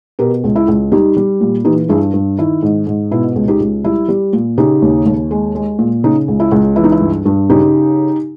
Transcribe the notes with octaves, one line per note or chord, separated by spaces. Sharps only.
B2 G4 A#4
C#2
E4
C#2
G3 D#4 G4
G3
A#2
E3 D#4 G4
G2 E4 G#4
G2
D#3 E4
G#2
G#2
B2 E4
C#2
D#4 G4
C#2
G3 E4
G3
A#2
C#3 D#4 G4
D#2
D#2
G#3
G#3
A#2
C#3 D#4
C#2
E4
C#2
E3 E4
D#4
E4
G2
G2
C#3 D#4 G4